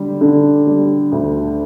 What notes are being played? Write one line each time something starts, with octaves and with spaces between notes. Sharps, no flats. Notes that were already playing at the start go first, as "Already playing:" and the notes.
Already playing: D3 G3
D3
G3
D2